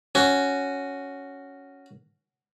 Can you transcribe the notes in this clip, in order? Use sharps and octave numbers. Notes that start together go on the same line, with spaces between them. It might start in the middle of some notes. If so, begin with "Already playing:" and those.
C#4 F#4